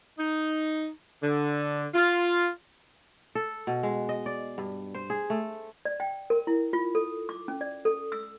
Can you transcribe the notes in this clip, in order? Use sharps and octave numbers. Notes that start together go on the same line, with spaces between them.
D#4
D3
F4
A4
B2
G#3
D#5
D5
G2
C5
G#4
A3
D5
G5
A#4
E4
F4
A4
D6
C#4
D5
A4
E6